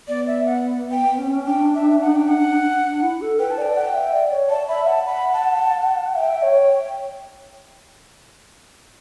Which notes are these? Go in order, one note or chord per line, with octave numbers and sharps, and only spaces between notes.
B3 D5
E5
F#5
G5
C#4
D4 G5
E5
F#5
G5
F#5
D4
E4
A4
B4 G5
A5
D5 G5
F#5
E5
D5
C#5
D5 A5
E5 B5
F#5 A5
B5
A5
E5 G5
C#5